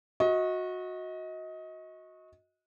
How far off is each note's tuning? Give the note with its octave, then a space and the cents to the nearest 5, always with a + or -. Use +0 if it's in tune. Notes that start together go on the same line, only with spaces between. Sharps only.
F#4 -20 D#5 +25